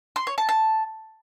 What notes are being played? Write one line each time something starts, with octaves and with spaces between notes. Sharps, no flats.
C6
C#5
A5
A5